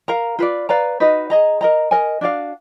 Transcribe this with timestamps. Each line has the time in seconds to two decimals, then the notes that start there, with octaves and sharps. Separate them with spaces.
0.08 A#4 F5 A#5
0.39 F4 B4 D5
0.69 B4 D5 F5 A#5
1.00 D#4 F#4 B4 D#5
1.30 G#4 D#5 A#5
1.61 A#4 D#5 A#5
1.91 A#4 D#5 G#5
2.21 D4 F#4 D5 F5